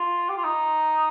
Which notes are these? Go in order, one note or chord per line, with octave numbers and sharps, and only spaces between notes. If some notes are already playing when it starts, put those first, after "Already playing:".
Already playing: F4
G4
F4
D#4